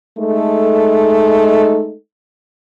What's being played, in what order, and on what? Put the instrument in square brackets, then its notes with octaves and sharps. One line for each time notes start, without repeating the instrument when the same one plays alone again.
[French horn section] G#3 A3 D#4 A4